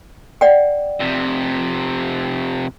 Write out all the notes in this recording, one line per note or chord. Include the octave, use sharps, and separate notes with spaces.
D5 F#5 G5
F2 C3